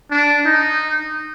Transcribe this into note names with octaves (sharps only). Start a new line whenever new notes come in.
D4
D#4